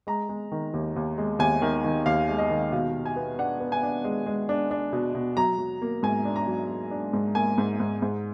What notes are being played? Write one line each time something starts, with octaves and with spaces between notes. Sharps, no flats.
G#3 A#5
G#3
D#3
D#2
D#2
G#3
D#2 G#5
D#3
D#3
D#2 F5
G#3
D#5
D#3
B2 F5
B2
G#5
B3
D4 F#5
B3
G#5
D4
G#3
G#3
D4
D4
B2
B2
F#3 A#5
F#3
A#3
G#2 G#5
D4
A#5
F#3
F#3
D4
G#2
A#3 G#5
G#2
G#2
G#2